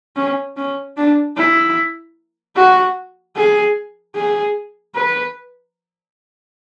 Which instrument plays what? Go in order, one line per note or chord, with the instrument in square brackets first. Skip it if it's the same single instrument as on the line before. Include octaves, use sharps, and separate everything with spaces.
[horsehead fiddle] C#4
C#4
D4
E4
F#4
G#4
G#4
B4